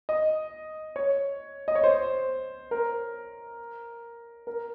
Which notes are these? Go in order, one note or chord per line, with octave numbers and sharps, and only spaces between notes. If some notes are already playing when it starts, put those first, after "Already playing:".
D#5
C#5
D#5
C#5
C5
A#4
A#4